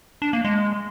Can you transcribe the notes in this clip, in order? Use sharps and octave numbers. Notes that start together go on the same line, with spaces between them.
D4
A#3
G#3